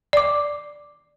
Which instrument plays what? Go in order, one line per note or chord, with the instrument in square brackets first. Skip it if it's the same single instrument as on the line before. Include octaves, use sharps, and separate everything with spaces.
[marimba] D5 D6